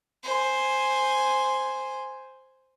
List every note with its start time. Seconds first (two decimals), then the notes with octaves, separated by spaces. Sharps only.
0.24 C5 G#5